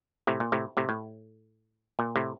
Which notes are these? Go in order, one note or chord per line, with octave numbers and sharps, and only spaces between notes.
A2 C3
A#2
A2 C3
A2 C3
A2
A#2
A2 C3